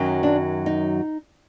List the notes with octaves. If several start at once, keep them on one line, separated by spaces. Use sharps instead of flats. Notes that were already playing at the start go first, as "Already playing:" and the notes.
Already playing: F#2 D#3 F#3
D4
D#4